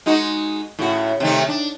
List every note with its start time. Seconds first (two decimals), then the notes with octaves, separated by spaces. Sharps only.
0.06 G#3 D#4 F#4
0.79 A2 C#3 F#4
1.20 C3 D#3 A3
1.48 D4